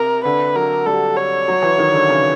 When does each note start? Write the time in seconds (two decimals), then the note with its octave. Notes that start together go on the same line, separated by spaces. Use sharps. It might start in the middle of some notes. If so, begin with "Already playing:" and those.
Already playing: C3 A#4
0.24 D3 B4
0.55 F#3 A#4
0.86 G3 A4
1.17 C#5
1.48 F#3
1.62 E3
1.78 D#3
1.93 D3
2.09 C#3